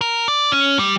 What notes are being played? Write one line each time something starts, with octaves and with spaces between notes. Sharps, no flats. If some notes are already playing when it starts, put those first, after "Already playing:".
A#4
D5
C#4
G3